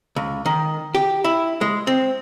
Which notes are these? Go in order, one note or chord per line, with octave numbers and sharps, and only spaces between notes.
C#2
D#3
G4
E4
G#3
C4